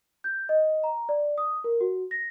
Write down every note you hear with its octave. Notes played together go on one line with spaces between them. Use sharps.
G6
D#5
A#5
D5
D#6
A#4
F#4
A#6